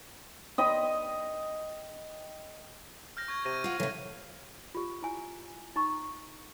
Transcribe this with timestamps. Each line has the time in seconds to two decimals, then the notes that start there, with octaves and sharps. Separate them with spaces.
0.58 D#5 G5 B5
3.17 F6 G6 A#6
3.28 C#6 G#6 A#6
3.45 C3 G#6 A#6 D#7
3.64 F4 F#5
3.80 A2 C#3 E3
4.75 F4 G4
5.03 E4 G#5
5.76 D#4 A#5 C#6